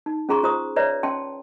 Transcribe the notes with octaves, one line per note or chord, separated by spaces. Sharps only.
D#4
C#4 F4 G#4 A#5 C6 C#6
F4 C5 A#5 C#6 D#6
B4 C#5 D5 E5 A#5
C#4 G5 A5 C6